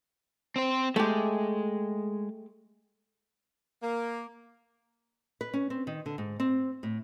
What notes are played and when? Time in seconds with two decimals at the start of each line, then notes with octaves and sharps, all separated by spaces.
0.56 C4 C5
0.96 G#3 A3 G4
3.82 A#3
5.41 B4
5.54 C#4
5.70 C4
5.87 D#3
6.06 D3
6.18 G#2
6.40 C4
6.83 A2